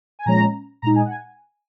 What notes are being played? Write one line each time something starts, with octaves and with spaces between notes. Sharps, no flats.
G#5
A#2 F3 G#3 C#4 A#5
A#2 G#3 D#4 A#5
G#5
F#5
G#5